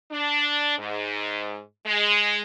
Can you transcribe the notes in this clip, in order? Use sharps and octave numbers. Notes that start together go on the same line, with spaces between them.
D4
G#2
G#3